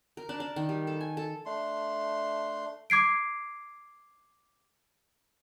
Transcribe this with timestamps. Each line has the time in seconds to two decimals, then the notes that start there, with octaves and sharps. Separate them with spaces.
0.17 A#4
0.29 D4
0.40 D4
0.56 D#3
0.69 G3
0.87 A4
1.01 G#5
1.17 A4
1.46 A3 D4 C6
2.90 D6 G#6 C7 D7